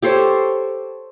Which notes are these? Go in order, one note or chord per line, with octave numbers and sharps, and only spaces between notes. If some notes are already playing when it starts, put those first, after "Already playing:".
G4 A4 C5 C#5